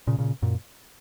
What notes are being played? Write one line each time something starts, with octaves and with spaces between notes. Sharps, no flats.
A#2 C#3
A#2 C#3
F#2 A#2